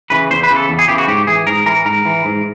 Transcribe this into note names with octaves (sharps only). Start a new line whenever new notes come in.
C#3 E3 B4
E2 C5
B4
C#3 E3
A4
E2
G#4
C#3 E3 G4
F#4
G#2 G4
E3 G#4
G#2 A#4
E3 A#4
G#2 A#4
E3
G#2